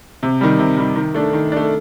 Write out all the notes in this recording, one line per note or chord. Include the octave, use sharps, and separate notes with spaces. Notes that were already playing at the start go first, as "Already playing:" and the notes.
C3
D#3 G3
C3
D#3 G3
D#3
A3 D4
D#3
A3 D4